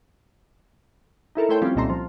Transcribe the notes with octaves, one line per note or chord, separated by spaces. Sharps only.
D#4 E4 A4 A#4
A3 E4 A4 C5 C#5 G5
F3 G3 C4 C#4 F4 G4
C2 A#2 D#4 A4 A#5 C6
F3